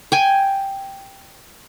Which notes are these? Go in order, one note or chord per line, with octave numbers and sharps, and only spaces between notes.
G5 G#5